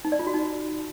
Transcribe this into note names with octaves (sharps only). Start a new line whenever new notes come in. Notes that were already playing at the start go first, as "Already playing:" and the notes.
D#4
D5
F4
F#4
D#4